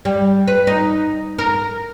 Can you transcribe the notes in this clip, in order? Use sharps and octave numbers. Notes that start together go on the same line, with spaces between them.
G3
B4
D#4
A#4